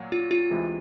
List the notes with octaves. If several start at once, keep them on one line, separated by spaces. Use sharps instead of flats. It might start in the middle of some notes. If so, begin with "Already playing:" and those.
Already playing: A#2 F#3 A#3
F4
F4
D2 C3 E3 G#3